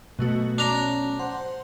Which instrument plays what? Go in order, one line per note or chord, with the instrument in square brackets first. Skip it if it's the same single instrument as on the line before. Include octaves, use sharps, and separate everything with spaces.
[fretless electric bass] B2 [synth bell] F#3 A3 F#4 [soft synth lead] D#5
[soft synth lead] C#4 [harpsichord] D4 A#5
[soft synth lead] C5 [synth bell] F#5 C6